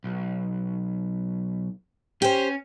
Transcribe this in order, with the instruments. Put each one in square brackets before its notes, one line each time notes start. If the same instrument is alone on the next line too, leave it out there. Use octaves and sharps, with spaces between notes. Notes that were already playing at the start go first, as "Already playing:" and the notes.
[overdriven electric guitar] B1
[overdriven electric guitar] C#4 [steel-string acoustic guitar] G4 C5